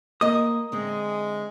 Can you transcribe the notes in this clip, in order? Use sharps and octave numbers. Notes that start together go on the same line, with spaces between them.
A#3 A#4 D#5 D#6
D3 G#3 C4 E5